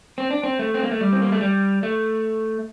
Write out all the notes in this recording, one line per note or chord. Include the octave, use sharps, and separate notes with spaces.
C4
D4
C4
A3
C4
A#3
A3
G3
C4
A#3
A3
G3
A3